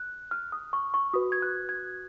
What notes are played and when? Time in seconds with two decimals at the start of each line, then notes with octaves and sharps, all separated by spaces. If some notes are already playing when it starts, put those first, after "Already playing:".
Already playing: F#6
0.31 F6
0.52 D#6
0.73 C#6
0.94 C#6
1.14 F#4 B4 D#6
1.32 G#6
1.42 F#6
1.69 G#6